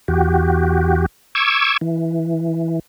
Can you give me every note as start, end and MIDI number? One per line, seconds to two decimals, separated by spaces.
0.08 1.06 40
0.08 1.06 66
0.08 1.06 67
1.35 1.77 85
1.35 1.77 86
1.35 1.77 88
1.35 1.77 92
1.81 2.79 52